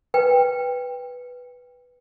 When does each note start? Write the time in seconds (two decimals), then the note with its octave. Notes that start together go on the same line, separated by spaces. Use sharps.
0.14 B4 G5